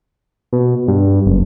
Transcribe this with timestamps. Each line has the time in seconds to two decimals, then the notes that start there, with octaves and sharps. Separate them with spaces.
0.53 B2
0.88 G2
1.26 F#1